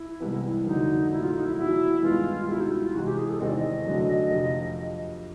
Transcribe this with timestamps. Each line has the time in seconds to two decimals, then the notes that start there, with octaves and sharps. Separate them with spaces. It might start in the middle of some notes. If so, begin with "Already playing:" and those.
Already playing: E4
0.20 C2 C3 E3 G#3 B3
0.66 F2 D3 F#3 A3 D#4
1.12 A#1 A#2 F#3 A3 E4
1.23 F4
1.35 D#4
1.45 E4
1.57 E2 B2 F#3 E4
2.03 G2 D#3 G#3 B3 F4
2.40 F4
2.48 C#2 B2 G3 E4
2.61 D#4
2.71 E4
2.83 F4
2.95 C3 E3 G#3 F#4
3.06 G4
3.18 G#4
3.29 A4
3.40 E2 C3 D#3 G#3 C4 D#5
3.48 D5
3.56 D#5
3.86 F#2 D3 F#3 A3 D4
4.31 F2 C3 F3